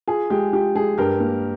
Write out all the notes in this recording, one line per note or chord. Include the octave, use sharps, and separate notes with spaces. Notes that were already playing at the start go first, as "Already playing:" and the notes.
F4 G#4
G#3 G4
F4 G4
G#3 G#4
G2 G4 A#4
A#3